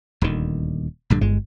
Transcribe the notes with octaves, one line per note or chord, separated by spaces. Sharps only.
D#1 D2 D#3
A#1 G2 D3
G1 G#3